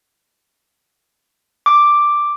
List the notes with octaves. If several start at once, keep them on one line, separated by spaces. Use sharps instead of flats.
D6